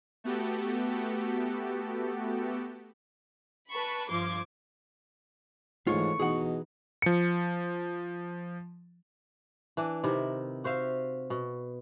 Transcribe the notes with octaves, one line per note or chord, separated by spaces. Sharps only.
A3 B3 F#4 G4 A4
B4 A5 B5 C#6
G2 F3 C6 D6 G#6
G#2 E3 A3 F4 C#5 C#6
B2 E3 D#4 G#4 F#5
F3 C#7
E3 D4
C3 D#3 E4
F#4 C5 E5 F5
B2